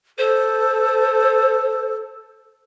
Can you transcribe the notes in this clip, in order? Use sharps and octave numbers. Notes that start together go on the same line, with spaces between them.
A4 C5